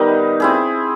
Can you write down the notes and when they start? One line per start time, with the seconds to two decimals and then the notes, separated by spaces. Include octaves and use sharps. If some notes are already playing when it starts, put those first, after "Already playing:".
Already playing: D#3 G3 B3 D#4
0.40 C4 E4 G#4